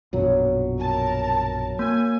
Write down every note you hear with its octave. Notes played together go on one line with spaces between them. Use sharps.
A#1 F#2 B2 F#3
A#4 A5
A#3 G#5